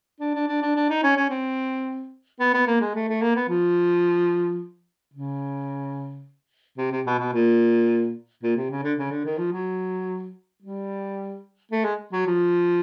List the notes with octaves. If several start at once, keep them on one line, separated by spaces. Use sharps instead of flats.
D4
D4
D4
D4
D4
D#4
C#4
C#4
C4
B3
B3
A#3
G#3
A3
A3
A#3
B3
F3
C#3
C3
C3
B2
B2
A#2
A#2
C3
C#3
D3
C#3
D3
D#3
F3
F#3
G3
A3
G#3
F#3
F3